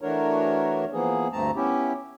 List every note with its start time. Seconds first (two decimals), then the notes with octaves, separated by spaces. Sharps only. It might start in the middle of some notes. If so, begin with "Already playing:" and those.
0.01 E3 A3 D4 F#4 A#4 C#5
0.93 E3 F3 A#3 B3 G#4
1.32 D2 G2 A3 C4 A5 A#5
1.56 B3 C#4 E4 G4